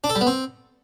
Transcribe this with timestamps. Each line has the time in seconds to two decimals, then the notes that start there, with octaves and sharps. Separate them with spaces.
0.04 D4
0.10 A4
0.15 G3
0.21 B3
0.27 C4